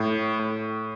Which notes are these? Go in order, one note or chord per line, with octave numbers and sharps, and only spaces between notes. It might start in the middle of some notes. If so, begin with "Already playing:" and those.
Already playing: A2
A2